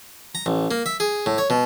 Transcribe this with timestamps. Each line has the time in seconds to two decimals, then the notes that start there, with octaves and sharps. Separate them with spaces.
0.35 A#5
0.46 A1
0.71 A#3
0.86 E5
1.00 G#4
1.26 A2
1.38 C#5
1.50 B2